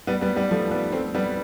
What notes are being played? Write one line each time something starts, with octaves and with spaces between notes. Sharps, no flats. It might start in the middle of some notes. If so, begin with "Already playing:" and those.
G3 B3
G3 B3
G3 B3
F3 A3
G3 B3
A3 C4
G3 B3